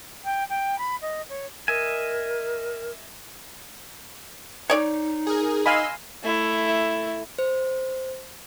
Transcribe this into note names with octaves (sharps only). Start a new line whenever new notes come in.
G5
G5
B5
D#5
C#5
A#4 D#5 E5 G#5
D#4 C#5 D5
G#4 A#4
D#5 F5 G#5 B5 C6 E6
A3 E4
C5